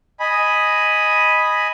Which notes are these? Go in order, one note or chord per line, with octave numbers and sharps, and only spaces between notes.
D#5 G#5 B5